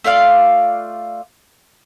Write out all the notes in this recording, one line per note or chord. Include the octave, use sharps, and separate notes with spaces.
A3 F4 D5 F5